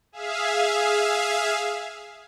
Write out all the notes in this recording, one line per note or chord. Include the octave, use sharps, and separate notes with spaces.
G#4 E5 F5